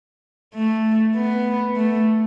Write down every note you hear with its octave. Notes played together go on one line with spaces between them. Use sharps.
A3
B3
A3